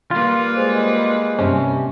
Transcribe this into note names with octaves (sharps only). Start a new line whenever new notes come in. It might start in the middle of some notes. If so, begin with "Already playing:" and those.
G3 A#3 F4 B4
G#3 G#4 C5
G2 C3 C4 C#4